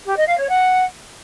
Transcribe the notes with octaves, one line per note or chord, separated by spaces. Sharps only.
G4
D#5
F5
C#5
F#5